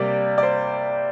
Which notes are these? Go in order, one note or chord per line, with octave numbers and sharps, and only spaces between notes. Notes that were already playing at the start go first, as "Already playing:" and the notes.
Already playing: C3 G3 A#3 D5
D5
C5